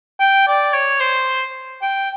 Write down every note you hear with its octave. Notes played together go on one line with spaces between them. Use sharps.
G5
D5
C#5
C5
G5